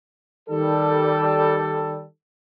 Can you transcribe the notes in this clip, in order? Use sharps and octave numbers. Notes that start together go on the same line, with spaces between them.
D#3 G3 A4